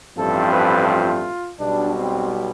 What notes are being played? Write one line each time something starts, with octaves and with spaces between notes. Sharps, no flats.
A1 G2 F3 A3 C4 A4
B4
F4
B1 B2 G3 D4
C4